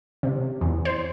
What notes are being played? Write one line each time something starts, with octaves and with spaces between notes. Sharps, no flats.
C3
E2
C5